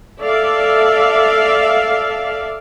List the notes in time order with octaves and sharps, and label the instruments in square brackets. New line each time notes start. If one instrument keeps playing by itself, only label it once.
[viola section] A4 D5 E5 F5